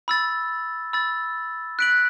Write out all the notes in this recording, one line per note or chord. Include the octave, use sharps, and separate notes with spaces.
B5 E6 A6
B5 E6 A6
F#6 B6 D7 F#7